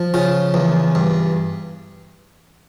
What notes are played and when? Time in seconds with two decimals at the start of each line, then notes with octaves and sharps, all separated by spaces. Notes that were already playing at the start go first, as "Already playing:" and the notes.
Already playing: F3
0.14 C#3 F4
0.54 E2
0.95 G2